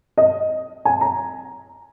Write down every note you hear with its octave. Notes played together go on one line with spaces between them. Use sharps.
D#5
G#5
A#5